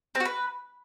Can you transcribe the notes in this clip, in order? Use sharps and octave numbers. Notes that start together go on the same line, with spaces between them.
C4
F#4
B4